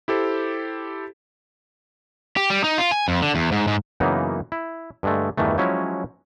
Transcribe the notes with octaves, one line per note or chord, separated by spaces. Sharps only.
E4 G4 A4 C5
G4
G3
D#4
F4
G#5
F2
D3
E2
G#2
G#2
F#2 C#3 E3 A#3 B3 D#4
E4
G2 D3 G#3 A3
E2 G2 D#3 E3 A3
F3 F#3 G#3 C#4 E4